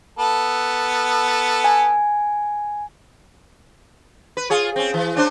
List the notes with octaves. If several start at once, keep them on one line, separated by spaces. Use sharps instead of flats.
B3 A4
G#5
B4
F4 G#4 C#5
C4 C#4
E3
C#4 D4 C5